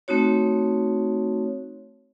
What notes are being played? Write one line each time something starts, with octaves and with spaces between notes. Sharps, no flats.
A3 C4 D#4 F#4 C#5